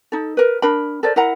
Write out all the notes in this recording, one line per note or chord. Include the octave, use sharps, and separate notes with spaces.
D#4 A4
A#4 B4
D4 A#4 B5
A4 A#4 C5 D5
E4 A#4 F#5 A#5